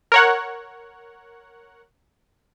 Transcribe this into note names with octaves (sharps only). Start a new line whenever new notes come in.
A#4 C#5 F#5